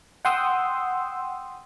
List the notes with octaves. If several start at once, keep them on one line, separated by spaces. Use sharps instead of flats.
F#5 G5 C6 D#6 E6